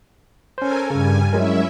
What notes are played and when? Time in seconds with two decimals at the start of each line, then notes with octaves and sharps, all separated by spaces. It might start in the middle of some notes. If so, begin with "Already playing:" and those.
0.58 C#4 A4 A#4 C5 G#5
0.90 G2 C#3 G3 G#5
1.33 F#3 G#3 C#4 E4 A#4 E5